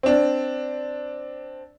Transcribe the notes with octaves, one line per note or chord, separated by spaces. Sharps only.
C4 D4